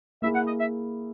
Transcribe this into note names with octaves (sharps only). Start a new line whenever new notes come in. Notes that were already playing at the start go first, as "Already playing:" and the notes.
A#3 E4 G#4 E5
F#5
D#5
E5